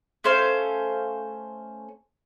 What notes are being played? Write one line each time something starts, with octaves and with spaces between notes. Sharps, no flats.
A3 C#4 C5 F5